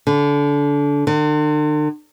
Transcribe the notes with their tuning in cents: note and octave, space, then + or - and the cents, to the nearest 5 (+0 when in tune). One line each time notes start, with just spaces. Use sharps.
D3 -25
D3 +45